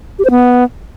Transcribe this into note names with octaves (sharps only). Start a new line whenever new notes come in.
G4
C5
B3